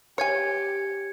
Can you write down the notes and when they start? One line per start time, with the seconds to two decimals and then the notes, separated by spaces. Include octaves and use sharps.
0.18 G4 C#5 G#5 G#6 C#7